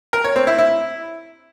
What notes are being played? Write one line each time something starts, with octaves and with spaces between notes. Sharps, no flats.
A#4
C#5
C4
E4
E4